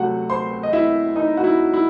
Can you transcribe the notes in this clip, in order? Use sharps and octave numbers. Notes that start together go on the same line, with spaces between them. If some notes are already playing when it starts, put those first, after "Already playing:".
Already playing: C3 F#3 A3 F#4 F#5
C5 C6
D#5
E4 E5
D#4 D#5
F#4
E4
E4